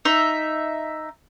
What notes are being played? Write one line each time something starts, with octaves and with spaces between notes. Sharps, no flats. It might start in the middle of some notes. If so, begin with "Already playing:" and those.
D#4 E5